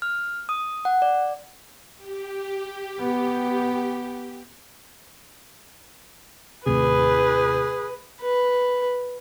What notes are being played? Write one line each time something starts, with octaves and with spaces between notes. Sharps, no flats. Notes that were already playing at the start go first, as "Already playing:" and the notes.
F6
D#6
F#5
D5
G4
B3
D#2 A2 C3 G#4 B4
B4